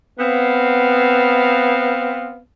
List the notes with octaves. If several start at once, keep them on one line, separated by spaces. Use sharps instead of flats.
B3 C4 F5